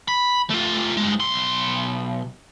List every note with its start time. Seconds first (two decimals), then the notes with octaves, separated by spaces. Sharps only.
0.08 B5
0.50 A3 F4
0.97 G2 G#3
1.20 B1 C6